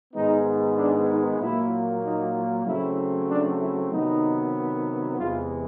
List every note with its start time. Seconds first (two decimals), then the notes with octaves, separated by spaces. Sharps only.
0.14 G#2 D#3 G#3 B3 D#4
0.77 D4
1.08 D#4
1.40 A#2 F#3 A#3 E4
2.03 D#4
2.66 C#3 F#3 A3 C4 E4
3.29 D4
3.60 E4
3.92 C3 D#3 F#3 B3 D#4
5.17 E2 C3 E3 G#3 F4